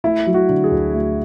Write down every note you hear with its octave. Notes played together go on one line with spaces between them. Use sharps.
A3 E4
F#3
F#4
D3
G#4
D2
A3